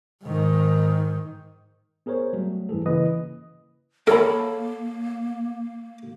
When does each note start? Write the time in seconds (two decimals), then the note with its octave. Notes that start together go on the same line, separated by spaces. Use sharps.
0.24 G#2 D#3
2.06 B3 G#4 A#4 C5 C#5
2.33 F#3 G3 A3
2.69 G2 E3 G#4 A4
2.86 C#3 E3 A#3 B4 D#5 D#6
4.07 A#3 A4 A#4 C#5 B5